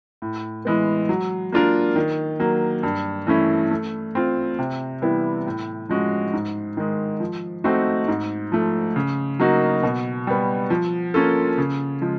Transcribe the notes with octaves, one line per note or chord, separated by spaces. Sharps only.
A2
E3 G#3 B3
F#3
A#3 D4 F4 A#4
D#3
F#3 A#3
G2
E3 A3 C#4 E4
A3
C4 F4
C3
E3 G3 B3 E4
A2
F3 G#3 C#4 F#4
G#2
D#3 G#3
F3
A3 C4 D#4 F#4
G#2
F3 A3
C#3
F#3 A#3 D#4 F#4
B2
G3 B3
F3
A#3 C#4 F4 A4
C#3
F3 G#3